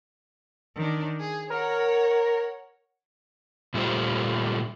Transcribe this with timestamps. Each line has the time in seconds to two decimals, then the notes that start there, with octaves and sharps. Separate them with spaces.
0.76 D#3 D4
1.20 G#4
1.50 A#4 C#5 F#5
3.74 A#2 G3 A3 F4 G4 C5